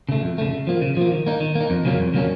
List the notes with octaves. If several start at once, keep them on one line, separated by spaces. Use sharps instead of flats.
C#3 A3
F2
C#3 A3
C#3
F3 A#3
C#3
F3 A#3
D#3
A#3 D#4
D#3
A#3
D#4
F2
C#3 F#3 A#3 C#4
F2
C#3 F#3 A#3 C#4